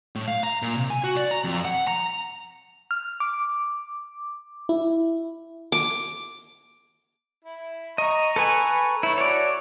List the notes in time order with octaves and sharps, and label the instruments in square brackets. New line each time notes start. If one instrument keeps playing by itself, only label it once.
[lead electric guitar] A2
F5
A#5
A#2
C3
G#5
F#4
D5
A#5
F2
F#5
A#5
[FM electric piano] F6
D6
E4
[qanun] D6
[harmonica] E4
[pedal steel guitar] D#5 [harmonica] A#5 C#6
[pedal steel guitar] A4 B4 G#5
[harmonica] A3 C#5 [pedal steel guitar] E4
[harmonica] F#4 A4 [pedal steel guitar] C#5 D5